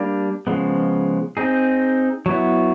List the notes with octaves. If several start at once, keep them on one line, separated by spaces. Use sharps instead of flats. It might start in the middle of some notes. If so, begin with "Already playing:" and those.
Already playing: G3 A#3 D4
C#3 F3 G#3 B3
C4 D#4 G#4
F#3 B3 E4